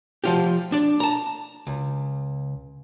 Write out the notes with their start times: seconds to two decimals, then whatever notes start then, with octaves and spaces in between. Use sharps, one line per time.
0.24 F3 F4 G4
0.72 D4 D5
1.00 A5 A#5
1.67 C#2